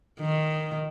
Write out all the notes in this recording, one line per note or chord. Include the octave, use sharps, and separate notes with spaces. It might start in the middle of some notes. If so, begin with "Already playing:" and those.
D#3